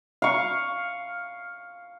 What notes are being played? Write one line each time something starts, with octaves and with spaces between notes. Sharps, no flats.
F5 C#6